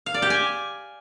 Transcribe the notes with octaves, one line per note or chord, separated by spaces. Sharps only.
F5
D5
G4
G#5